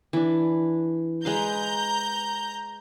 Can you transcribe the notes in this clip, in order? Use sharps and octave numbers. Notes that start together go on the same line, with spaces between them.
E3 D4
G#3 B4 F5 A#5 G6